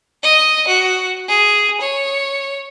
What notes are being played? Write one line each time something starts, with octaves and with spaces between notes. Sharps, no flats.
D#5
F#4
G#4
C#5